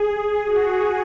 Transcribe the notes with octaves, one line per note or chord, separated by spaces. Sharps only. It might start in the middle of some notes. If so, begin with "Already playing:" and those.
Already playing: G#4
F#4